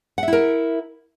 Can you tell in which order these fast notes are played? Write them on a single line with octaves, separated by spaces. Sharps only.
F#5 E5 E4 A#4